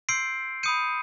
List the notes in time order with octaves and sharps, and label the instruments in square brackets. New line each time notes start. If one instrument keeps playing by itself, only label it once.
[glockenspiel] C6 E6 G6 C7 D7
B5 D#6 G6 C#7 D#7